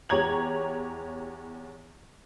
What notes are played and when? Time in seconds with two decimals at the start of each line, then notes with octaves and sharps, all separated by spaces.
0.09 E2 G4 C#5 A#5 G#6 F#7